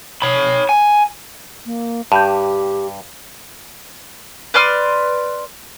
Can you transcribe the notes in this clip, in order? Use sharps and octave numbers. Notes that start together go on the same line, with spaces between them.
C#5 B5
G#5
A#3
G2 G4 A5 B5 G6
B4 D5 C6 F6